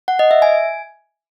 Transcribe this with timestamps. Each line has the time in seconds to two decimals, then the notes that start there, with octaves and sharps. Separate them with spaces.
0.08 F#5
0.19 D#5
0.31 E5
0.42 G#5